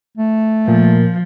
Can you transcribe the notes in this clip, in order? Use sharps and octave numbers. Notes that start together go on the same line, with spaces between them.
A3
A#2 F3